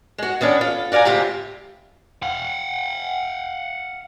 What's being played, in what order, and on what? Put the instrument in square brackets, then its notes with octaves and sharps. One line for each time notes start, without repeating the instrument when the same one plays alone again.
[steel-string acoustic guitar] G#3 F#4
D#3 B3 C#4 D4
F4 A4
F#4 D5 F5 G#5 A#5
D2 G#2 C3 E4 F4 G4
[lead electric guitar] F5 F#5